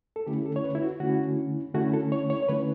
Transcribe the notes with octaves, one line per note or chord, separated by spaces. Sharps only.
A4
D3 A3 C#4 E4 G4
A4
C#5
B4
E4
F#4
D3 A3 C#4 E4 F#4
D3 A3 C#4 E4 F#4
A4
C#5
C#5
C#5
D3 A3 C#4 E4 B4